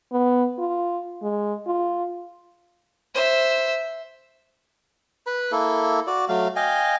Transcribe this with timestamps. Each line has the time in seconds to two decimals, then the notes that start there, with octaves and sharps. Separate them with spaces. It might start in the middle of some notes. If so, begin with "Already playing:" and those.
0.12 B3
0.59 F4
1.23 G#3
1.67 F4
3.15 C5 E5
5.27 B4 B5
5.52 A#3 E4 A4
6.07 F#4 D5
6.29 F#3 A3 F5
6.56 D#5 F5 G5 G#5